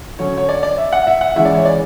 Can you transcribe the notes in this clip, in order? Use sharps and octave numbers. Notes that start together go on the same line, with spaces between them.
D3 F#3 C#4 C#5
C#5
D5
D5
E5
F#5
E5
F#5
C#3 E3 G#3 E5
D5
C#5
D5